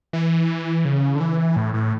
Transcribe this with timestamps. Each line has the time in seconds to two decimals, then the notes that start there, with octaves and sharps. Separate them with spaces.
0.13 E3
0.85 C#3
1.15 D3
1.20 E3
1.56 A2
1.74 A2